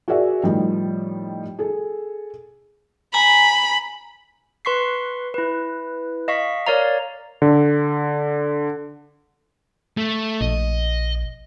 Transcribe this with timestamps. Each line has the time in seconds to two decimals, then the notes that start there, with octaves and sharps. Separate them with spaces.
0.08 F#4 G#4 A#4 D5 E5 F#5
0.43 A2 D#3 F3 G3
1.59 G#4 A4
3.14 G#5 A#5 B5
4.65 B4 C6 C#6 B6 C7
5.34 E4 B4
6.28 D#5 F5 C#6 B6
6.66 A#4 C#5 D5 F5 A#5
7.42 D3
9.97 A3
10.41 A#1 D#5